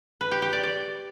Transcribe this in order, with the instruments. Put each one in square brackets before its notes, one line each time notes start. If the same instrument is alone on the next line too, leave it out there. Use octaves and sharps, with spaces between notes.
[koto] B4
G4
G4
D5
D5